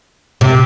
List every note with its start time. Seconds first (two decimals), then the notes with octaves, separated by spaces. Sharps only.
0.41 C3